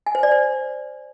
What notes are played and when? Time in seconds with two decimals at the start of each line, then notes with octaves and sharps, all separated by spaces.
0.06 G#5
0.15 C5
0.23 D5
0.31 C5